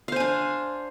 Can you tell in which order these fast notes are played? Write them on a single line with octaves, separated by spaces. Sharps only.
F5 C5 G#5 D4